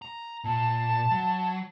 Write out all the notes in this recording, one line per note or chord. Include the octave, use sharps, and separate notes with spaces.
A#5
A#2 A5
F#3